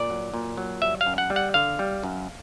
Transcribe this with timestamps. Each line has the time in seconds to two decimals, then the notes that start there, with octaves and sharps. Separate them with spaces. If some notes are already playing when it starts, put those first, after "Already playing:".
Already playing: A#2 D5
0.10 F#3
0.34 A#2
0.57 F#3
0.82 G3 E5
1.01 F5
1.06 F#2
1.18 F#5
1.30 G3
1.36 F#5
1.54 D3 F5
1.79 G3
2.03 F#2